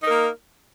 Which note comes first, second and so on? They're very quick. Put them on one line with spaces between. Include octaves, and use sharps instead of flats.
D#4 A#4 A#3